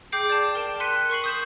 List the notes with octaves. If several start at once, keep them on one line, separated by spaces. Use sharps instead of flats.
G#4 G5 D6 G6 C7 D7
D5 A5
A#4 G5 E7
C6 F#6 B6 C#7 D#7
A#4 C#6 C7 F#7
D#6 G6 E7